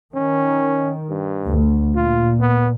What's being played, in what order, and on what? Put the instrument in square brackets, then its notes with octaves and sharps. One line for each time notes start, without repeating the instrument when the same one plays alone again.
[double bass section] D#3 [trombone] C#4
[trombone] G2
[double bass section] D2
[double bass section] A#2 [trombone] F4
[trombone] B3